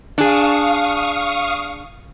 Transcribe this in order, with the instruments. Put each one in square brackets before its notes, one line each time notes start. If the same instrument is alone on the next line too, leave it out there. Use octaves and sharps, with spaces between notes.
[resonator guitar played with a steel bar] D4 G#4 [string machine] F5 C#6 D#6